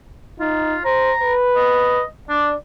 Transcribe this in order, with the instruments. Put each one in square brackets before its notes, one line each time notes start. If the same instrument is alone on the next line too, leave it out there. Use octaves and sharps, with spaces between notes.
[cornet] D#4 [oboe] F4
[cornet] C5 [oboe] A#5
[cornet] B4
[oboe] D#5
[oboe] D4 [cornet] D5